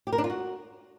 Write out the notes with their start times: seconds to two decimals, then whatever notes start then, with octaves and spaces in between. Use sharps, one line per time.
0.07 G4
0.13 A#4
0.18 D4
0.24 F4
0.30 F#4